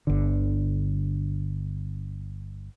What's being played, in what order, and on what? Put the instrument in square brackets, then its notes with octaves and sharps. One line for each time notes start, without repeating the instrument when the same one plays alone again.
[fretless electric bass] G1 D3